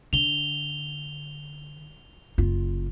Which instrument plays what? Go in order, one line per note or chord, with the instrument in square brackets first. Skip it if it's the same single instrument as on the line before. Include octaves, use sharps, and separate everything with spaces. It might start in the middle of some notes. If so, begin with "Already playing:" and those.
[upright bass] D3 [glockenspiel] F7 G7
[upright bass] F#1 F4